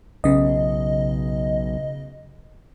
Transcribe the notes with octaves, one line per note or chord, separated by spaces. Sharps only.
B1 C#3 D#5